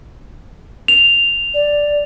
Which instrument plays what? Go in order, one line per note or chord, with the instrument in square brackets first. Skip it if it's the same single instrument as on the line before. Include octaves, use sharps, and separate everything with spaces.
[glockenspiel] F7
[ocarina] D5